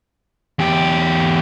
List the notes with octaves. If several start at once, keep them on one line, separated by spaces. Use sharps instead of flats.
E2 G4